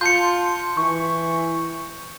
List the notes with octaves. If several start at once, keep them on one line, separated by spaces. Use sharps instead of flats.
F4 A5 C6 G6 C#7
E3 C#6